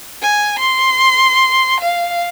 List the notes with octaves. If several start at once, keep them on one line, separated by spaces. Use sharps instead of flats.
G#5
C6
F5